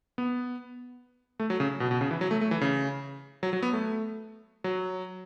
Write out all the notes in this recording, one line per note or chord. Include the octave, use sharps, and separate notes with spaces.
B3
A3
F#3
C#3
B2
B2
C#3
E3
F#3
A3
A3
E3
C#3
F#3
F#3
B3
A3
F#3